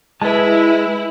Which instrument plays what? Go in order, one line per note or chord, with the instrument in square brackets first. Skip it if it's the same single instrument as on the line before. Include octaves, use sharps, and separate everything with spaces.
[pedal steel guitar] G#3 [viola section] E4 [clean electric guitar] B4 A5